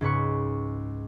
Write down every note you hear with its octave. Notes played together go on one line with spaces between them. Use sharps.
C#2 G#2 B4 C#6